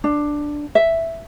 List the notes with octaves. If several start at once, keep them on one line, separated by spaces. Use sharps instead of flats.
D4
E5